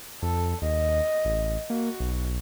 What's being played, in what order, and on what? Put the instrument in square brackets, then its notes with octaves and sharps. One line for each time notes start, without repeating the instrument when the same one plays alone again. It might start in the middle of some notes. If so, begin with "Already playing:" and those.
[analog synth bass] F2 [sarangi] A4
[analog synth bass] D#2 [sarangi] D#5
[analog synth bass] A1
[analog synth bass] A#3 [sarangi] F#4
[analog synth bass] B1